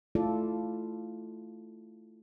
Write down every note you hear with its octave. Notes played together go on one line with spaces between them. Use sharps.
A3 E4 F4 A4 D5